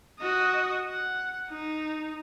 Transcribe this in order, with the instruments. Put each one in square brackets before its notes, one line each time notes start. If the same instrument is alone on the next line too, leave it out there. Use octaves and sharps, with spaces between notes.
[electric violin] F#4 D#5
F#5
D#4